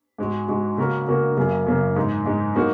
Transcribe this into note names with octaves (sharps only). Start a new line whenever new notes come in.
G#2 G#3 F#4
G#2 G#3 F#4
C#3 A#3 F#4 A#4
C#3 A#3 F#4 A#4
F#2 C#3 A#3
F#2 C#3 A#3
G#2 G#3 D#4
G#2 G#3 D#4
F#3 A#3 D#4 F#4